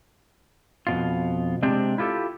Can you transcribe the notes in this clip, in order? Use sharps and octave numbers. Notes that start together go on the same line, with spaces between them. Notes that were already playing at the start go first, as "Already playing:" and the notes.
F2 B2 F4
C3 G#3 C4 D4 G4
E4 F4 G4 A4